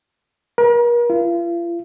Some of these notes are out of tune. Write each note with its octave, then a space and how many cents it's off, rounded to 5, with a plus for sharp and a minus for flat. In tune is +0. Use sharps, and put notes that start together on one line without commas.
A#4 +40
F4 -40